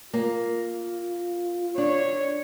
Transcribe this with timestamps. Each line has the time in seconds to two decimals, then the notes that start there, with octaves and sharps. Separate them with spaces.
0.13 A#3 F4
1.78 D4 C#5